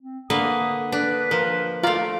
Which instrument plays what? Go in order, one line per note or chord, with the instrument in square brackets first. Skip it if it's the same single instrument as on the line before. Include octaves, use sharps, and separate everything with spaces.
[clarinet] C4
[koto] D3 A#3 B4 [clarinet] D#6
[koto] D4 [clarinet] B4
[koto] F3 [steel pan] A#4
[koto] A3 D5 [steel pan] F4 F5 A#5